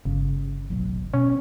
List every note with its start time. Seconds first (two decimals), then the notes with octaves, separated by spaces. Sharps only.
0.05 G1 C#3
0.70 D1 B1 F#3
1.14 B2 C#4